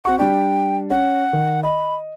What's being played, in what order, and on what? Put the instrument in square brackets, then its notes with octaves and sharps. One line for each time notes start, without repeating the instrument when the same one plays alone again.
[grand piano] C4 F#4 C#6 [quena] F#5
[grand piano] G3 D4 [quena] G5
[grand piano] C#4 [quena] F#5
[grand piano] D#3
[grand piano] D#5 [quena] B5